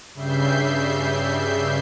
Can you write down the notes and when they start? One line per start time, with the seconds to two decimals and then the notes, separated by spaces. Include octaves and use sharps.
0.14 G2 C#3 G3 E5 G6 C7